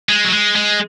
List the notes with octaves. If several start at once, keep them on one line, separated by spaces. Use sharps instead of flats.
G#3
F#3
G#3
G#3